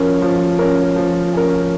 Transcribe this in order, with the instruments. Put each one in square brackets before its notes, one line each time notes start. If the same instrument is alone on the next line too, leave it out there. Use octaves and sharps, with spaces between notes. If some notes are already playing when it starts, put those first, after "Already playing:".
Already playing: [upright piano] F3 C#4 A#4
F3
C#4 A#4
F3
C#4 A#4